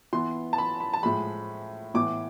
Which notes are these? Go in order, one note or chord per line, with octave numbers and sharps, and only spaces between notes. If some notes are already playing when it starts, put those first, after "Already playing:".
E3 B3 C6
A5
B5
B5
A5
A2 F3 G#3 B5
A2 E3 B3 D6